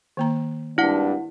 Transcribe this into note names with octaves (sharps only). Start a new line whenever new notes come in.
D#3 A#3 A#5
G#1 G2 D4 E4 F#5